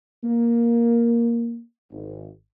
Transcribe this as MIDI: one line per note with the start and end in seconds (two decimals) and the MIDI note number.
0.24 1.61 58
1.91 2.29 32